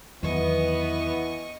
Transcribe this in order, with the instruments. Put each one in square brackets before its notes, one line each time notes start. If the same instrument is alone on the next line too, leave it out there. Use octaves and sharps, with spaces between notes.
[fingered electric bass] E2 D#3 F#3 [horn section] E3 [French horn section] B3 [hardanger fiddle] D#5 C#6